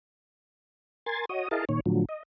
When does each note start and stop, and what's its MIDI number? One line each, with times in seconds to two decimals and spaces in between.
1.06 1.25 70
1.06 1.25 80
1.06 1.25 84
1.06 1.25 92
1.06 1.25 93
1.29 1.48 66
1.29 1.48 73
1.29 1.48 75
1.29 1.48 87
1.51 1.65 64
1.51 1.65 68
1.51 1.65 70
1.51 1.65 75
1.51 1.65 77
1.51 1.65 81
1.69 1.80 46
1.69 1.80 51
1.69 1.80 73
1.86 2.05 45
1.86 2.05 50
1.86 2.05 53
1.86 2.05 54
2.09 2.23 75